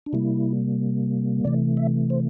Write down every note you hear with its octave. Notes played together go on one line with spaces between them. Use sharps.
D4
C3 G3 A#3 E4
C3 E3 A3 D5
E5
C5